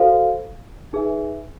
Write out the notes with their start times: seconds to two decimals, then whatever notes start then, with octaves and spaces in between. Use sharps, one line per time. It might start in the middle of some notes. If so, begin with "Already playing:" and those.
Already playing: F#4 A4 C5 F5
0.93 D#4 G#4 B4 E5 G#5